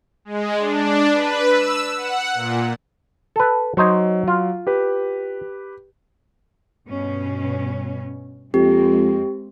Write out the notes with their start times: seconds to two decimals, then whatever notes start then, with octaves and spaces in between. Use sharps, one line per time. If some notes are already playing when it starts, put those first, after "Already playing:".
0.25 G#3
0.57 D4
1.11 B4
1.49 E6
1.97 F#5
2.34 A#2
3.36 A4 B4
3.77 F#3 D#4 C5 C#5
4.28 F4
4.67 G4 B4
6.88 G2 B2 C#4
8.54 F2 G#3 A#3 C4 G4